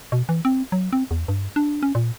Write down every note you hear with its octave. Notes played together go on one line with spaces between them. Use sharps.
B2
E3
C4
F#3
C4
E2
G2
D4
C#4
A#2